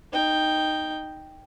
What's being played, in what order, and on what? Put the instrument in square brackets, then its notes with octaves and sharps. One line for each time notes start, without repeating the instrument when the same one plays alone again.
[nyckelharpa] D#4 G5